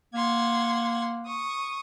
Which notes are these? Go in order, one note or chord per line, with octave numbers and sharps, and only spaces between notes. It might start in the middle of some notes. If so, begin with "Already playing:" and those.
A#3 F#5 C6 G#6
C#6 D#6